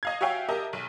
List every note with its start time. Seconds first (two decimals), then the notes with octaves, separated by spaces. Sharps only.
0.03 D#5 F5 G#6
0.21 F#4 C#5 E5 F5 G5 G#5
0.49 G4 A#4 D#5 E5 A5
0.73 B1